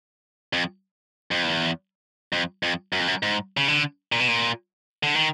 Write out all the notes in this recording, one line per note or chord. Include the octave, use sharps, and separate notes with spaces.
F2
F2
E2
F2
F2
F#2
F2
F#2
G#2
C#3
D3
A#2
B2
A#2
D3
D#3